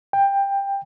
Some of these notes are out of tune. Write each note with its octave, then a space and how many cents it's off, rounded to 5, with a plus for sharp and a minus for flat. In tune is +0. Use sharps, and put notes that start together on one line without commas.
G5 +15